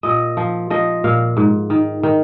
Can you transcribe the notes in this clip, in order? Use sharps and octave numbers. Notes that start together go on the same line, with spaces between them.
A#2 D#5
F3
F3 D#5
A#2 F5
G#2
D#3
D#3